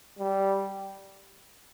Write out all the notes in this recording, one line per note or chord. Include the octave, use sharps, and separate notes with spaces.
G3